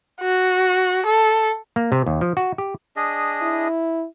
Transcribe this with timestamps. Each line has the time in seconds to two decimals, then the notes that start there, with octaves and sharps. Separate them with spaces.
0.21 F#4
1.06 A4
1.76 A#3
1.92 C3
2.06 D#2
2.21 F3
2.37 F#4
2.58 G4
2.96 D4 G#4 D#5
3.42 E4